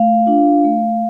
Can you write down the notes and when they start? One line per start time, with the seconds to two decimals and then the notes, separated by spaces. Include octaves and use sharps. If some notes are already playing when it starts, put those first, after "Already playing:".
Already playing: A3 F5
0.26 D4 F4
0.64 A3